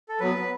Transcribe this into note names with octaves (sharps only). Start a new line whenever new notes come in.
A4
F#3 B3 B4